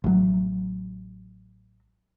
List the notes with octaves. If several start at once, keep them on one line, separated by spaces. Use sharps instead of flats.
A1 A2 C#3 F#3